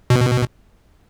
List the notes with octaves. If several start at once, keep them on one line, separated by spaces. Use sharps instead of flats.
B2